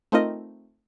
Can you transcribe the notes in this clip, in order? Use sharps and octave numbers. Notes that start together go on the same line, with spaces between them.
A3 C4 D#4 F4 A#4 D#5